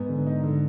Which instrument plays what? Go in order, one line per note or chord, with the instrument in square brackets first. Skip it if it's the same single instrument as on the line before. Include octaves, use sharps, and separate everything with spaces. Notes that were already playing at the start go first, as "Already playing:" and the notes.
Already playing: [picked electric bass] G#2 [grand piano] B3
[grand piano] D3
D#4
D3